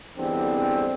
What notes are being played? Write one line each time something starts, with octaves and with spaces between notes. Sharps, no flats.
E2 D3 G3 G#3 C4